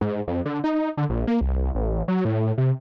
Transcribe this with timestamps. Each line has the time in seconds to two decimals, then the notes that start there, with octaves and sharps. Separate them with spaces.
0.01 G#2
0.28 F2
0.45 D3
0.64 D#4
0.97 D3
1.09 A#1
1.27 A#3
1.41 C2
1.75 A1
2.08 F#3
2.25 A2
2.58 C3